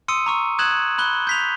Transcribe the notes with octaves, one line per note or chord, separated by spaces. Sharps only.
C6 D#6 E6 C#7 D#7
A#5 C#6 E6
D#6 F#6 G#6 E7 F#7
B5 F#6 G7
G6 B6 F7